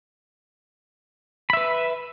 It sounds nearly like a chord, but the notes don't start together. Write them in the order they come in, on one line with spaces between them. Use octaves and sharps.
B5 E5 B4